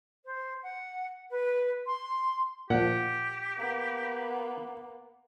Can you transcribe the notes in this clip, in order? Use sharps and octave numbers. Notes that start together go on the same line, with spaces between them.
C5
F#5
B4
C6
A#2 F3 G4 F#5
A#3 B3